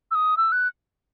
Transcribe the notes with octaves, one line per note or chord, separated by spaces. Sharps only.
E6
D#6
E6
F#6